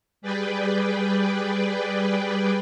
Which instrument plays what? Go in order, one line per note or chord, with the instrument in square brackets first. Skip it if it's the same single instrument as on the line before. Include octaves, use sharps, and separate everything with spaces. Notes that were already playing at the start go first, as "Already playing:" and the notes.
[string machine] G3 G#4 B4 D5 G5